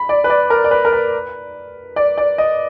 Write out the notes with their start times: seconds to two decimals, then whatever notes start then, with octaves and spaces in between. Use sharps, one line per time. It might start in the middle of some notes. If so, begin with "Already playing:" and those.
Already playing: B5
0.09 D5
0.24 B4
0.30 D5
0.50 A#4
0.64 D5
0.71 B4
0.85 A#4
0.93 B4
1.96 D5
2.18 D5
2.38 D#5